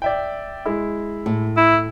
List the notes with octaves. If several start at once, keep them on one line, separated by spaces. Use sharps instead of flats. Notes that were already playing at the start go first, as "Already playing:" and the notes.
D5 E5 G5
G#3 E4
A2
E4